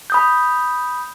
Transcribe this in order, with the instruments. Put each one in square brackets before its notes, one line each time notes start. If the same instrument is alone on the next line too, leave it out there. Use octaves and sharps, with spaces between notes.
[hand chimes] B5 D#6 G6